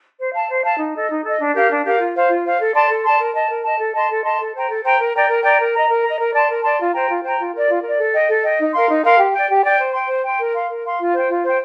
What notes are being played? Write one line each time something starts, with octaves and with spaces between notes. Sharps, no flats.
C5
F5 A5
C5
F5 A5
D#4
A4 D#5
D#4
A4 D#5
D4
G4 A#4 F5
D4
G4 A#4 F5
F4
C5 F5
F4
C5 F5
A4
D5 A5 C6
A4
D5 A5 C6
A#4
D#5 A5
A#4
D#5 A5
A4
D#5 A5 C6
A4
D#5 A5 C6
A4
C5 G5 A#5
A4
C5 G5 A#5
A#4
D5 G5 A#5
A#4
D5 G5 A#5
A#4
D#5 A#5
A#4
D#5 A#5
A#4
D5 A5 C6
A#4
D5 A5 C6
F4
C5 G5 A#5
F4
C5 G5 A#5
F4
A#4 D5
F4
A#4 D5
A4
D#5 G5
A4
D#5 G5
D#4
A#4 F5 C6
D#4
A#4 F5 C6
G4
D5 G5
G4
D5 G5
C5
G5 C6
C5
G5 C6
A#4
F5 C6
A#4
F5 C6
F4
C5 G5
F4
C5 G5